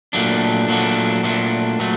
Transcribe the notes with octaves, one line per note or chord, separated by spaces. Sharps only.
A#2 F#3 A3 D4
A#2 F#3 A3 D4
A#2 F#3 A3 D4
A#2 F#3 A3